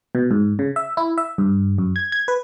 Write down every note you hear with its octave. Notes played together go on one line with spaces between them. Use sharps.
B2
G#2
C#3
E5
E4
E5
G2
F#2
G#6
G#6
B4